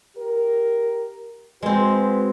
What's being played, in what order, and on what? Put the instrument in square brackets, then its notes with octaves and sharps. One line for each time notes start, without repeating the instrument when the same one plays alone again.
[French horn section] G4 A#4
[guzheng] G#3 C4 [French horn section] F#4 B4